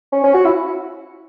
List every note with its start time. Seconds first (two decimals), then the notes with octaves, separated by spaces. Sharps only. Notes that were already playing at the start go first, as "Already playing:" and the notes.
0.12 C#4
0.24 C#4
0.34 F#4
0.45 E4